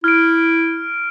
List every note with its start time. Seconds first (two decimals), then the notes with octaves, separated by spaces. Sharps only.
0.04 E4 F6 D7